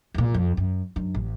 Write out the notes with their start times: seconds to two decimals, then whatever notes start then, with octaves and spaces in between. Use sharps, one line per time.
0.14 E2 A#2
0.34 F2
0.57 F#2
0.96 F#2 D4
1.15 A1